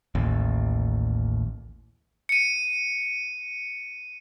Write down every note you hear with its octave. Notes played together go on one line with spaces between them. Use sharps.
A1 D#2
C#7 D#7